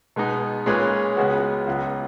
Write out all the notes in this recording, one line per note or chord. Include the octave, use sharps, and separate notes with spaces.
B2 G#3 B3 D#4
A#2 G#3 C#4 G#4 B4
C#2 C#3 G#3 B3 F#4
C#2 C#3 F#3 B3 F4